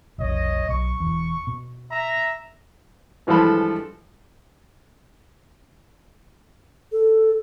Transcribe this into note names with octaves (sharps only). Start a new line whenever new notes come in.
F1 B1 C#5 D#5
B1 C#6
E1 E2
B2
E5 A#5
G2 E3 F3 G#3 A4 B5
A4